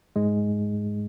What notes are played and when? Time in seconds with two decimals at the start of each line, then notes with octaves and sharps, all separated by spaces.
0.16 G#2 G#3